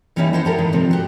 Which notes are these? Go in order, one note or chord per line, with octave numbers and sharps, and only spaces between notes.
E3 G3 A#3 C#4 D#4 E4
E4 A4 C5 D#5 F#5
G4 A4 A#4
G#2 D#3 E3
C3 F3 C4
F#4 G4